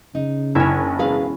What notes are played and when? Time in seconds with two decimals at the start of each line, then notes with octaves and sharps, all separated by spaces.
0.15 C#3 D#4
0.55 F#1 C#4 D4 E4
0.99 E1 G#4 B4 F5